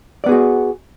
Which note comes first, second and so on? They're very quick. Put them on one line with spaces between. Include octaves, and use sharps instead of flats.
D5 B3 G#4 F#4